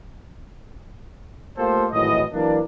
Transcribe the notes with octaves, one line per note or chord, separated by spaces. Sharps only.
A3 A#3 F4 G4 A4 C5
G#1 A2 E3 F#3 D#5
E3 F#3 A#3 D4